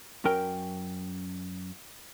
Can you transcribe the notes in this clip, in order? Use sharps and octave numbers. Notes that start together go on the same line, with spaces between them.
F#2 C#4 A#4 G5